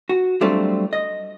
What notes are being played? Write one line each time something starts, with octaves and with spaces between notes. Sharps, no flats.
F#4
F#3 G3 A3 C4 D4 F4
D#5